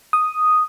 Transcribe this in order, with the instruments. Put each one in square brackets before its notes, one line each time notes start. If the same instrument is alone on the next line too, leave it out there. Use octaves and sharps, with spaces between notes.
[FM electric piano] D#6